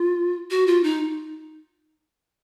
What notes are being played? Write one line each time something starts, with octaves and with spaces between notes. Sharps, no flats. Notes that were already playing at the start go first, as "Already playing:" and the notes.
Already playing: F4
F#4
F4
D#4